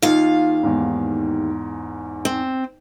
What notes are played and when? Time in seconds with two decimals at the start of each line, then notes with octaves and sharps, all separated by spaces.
0.02 D#2 F4 F5
0.63 E2 G#2
2.25 C4